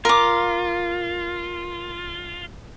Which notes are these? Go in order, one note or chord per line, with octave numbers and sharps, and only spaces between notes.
F4 A#4 D6